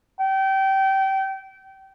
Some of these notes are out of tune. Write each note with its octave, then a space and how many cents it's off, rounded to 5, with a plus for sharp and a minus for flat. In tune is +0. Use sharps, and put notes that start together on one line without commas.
G5 -25